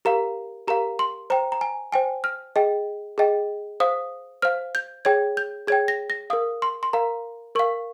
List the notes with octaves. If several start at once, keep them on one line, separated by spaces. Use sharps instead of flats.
G4 A#4 F5 A#5
G4 A#4 F5 A#5
C6
C5 G5 A#5
A#5
G#5
C5 G5 G#5
F6
G#4 D#5 G5
G#4 D#5 G5
C5 F5 D#6
C5 F5 F6
G6
G#4 C#5 G5 G#6
G6
G#4 C#5 G5 G#6
A#6
A#6
A#4 F5 D#6
C6
C6
A#4 F5 A#5
A#4 F5 C#6